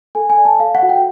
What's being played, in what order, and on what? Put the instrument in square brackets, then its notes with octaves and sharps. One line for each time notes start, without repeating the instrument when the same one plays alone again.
[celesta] A4 G#5
G#5
D5
A5
A4 F5
F#5
F#4
G5